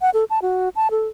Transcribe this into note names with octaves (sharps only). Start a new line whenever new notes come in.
F#5
A4
A5
F#4
A5
A4